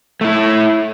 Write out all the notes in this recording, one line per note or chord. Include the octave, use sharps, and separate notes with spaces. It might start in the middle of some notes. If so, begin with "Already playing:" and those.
A3 E4